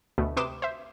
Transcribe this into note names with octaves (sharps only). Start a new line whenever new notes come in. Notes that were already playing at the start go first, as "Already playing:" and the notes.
D2 B2 A3
C3 B4 C6 D6 D#6 E7
C5 E5